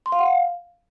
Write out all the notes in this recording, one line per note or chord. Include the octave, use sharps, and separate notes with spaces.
C6
F5
F#5
F5